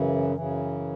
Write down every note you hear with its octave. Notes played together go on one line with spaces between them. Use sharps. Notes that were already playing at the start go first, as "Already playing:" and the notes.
Already playing: F#2 C#3 E3
F#2 C#3 E3